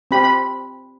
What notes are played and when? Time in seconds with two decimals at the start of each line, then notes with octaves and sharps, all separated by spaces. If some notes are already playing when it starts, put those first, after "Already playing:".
0.11 C4 G4 B5
0.23 B5